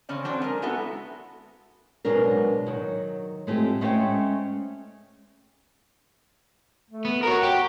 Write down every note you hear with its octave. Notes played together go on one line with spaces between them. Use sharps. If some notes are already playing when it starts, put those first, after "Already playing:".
C#3 C4 C#4 D5
F#3 C4 D4
G#3 A#4
G#3 B3 E4 F#4 A4
B2 F#3 G#3 D4 A#4
D#3 F#3
G#3 A3 C4 F4 G4
G#3 A3 C#4 C5 G5
A3
B3
F#4 A#4 C#5
G4